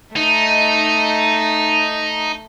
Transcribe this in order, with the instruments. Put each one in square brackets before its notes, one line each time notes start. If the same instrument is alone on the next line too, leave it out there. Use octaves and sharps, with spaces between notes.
[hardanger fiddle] A3 [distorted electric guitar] D#4